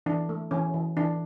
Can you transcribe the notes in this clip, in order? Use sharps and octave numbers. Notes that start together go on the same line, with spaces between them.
E3 D4
A3
E3 C#4
E3
E3 D4